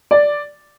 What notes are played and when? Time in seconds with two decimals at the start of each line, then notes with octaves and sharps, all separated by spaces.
0.11 D5